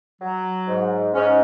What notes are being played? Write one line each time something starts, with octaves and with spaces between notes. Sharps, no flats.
F#3
G#2
G#2 C#4